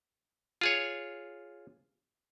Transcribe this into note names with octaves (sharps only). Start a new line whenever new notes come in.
F4 G#4 C#5